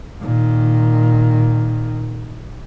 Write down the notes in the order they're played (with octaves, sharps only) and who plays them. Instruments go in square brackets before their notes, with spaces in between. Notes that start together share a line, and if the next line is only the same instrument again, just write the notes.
[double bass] A#2 D#3